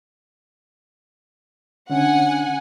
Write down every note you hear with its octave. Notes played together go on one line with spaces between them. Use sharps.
D3 C#4 D4 F#5 G#5